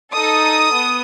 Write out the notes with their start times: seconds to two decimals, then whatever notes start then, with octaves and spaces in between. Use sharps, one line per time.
0.12 D#4 A4 D#6
0.73 B3